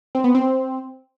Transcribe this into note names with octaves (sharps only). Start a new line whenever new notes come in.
C4
B3
C4